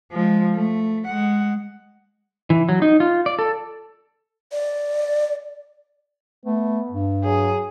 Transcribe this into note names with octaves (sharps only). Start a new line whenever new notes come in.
F3 G#3
A3
G#3 F#5
E3
F#3
D#4
F4
D5
A4
D5
A3 B3
G2
F#3 G#4